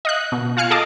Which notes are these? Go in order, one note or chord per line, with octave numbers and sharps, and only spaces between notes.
D#5 F5 F#6
B2
F4 F5 G#5 F6 C#7
G#4 A4 D#5 F5 A5 D6